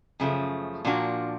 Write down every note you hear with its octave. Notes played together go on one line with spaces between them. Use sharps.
F#2 C#3 F3 A3
A#2 F3 A#3 D4 F#4